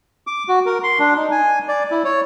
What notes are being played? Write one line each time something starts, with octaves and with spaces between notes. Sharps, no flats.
D6
F#4
A#4
C6
D4
D#4
G#5
D5
E4
C#5